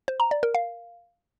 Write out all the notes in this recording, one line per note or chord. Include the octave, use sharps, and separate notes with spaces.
C5
A#5
D5
A#4
F5